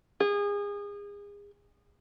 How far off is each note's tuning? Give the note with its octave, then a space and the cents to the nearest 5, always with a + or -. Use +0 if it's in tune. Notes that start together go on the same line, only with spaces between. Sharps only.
G#4 -30